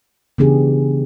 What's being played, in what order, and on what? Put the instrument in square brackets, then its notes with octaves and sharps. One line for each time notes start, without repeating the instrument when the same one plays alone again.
[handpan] C#3 E3 B3 D4 G4 G#4